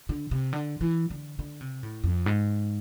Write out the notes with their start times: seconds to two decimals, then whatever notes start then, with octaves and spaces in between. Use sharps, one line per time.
0.09 D3
0.31 C3
0.53 D3
0.81 E3
1.10 D3
1.39 D3
1.61 C3
1.83 A2
2.03 F2
2.26 G#2